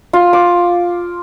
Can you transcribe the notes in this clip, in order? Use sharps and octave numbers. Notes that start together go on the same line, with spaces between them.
F4
D6